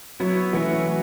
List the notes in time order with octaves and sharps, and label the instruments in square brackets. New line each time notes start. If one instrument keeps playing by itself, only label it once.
[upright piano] F#3 [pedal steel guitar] B3 E4 C#5 E5
[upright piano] E3 [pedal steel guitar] A3 C#4 F#4 B4 E5
[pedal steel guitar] F#3